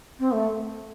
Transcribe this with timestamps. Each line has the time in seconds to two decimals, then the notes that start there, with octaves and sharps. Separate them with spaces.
0.19 C4
0.32 A3